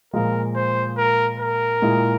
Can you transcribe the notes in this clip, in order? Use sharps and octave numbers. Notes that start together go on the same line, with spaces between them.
A#2 F3 G#3 A#4
C5
A#4
A#4
A#2 G#3 E4 G#4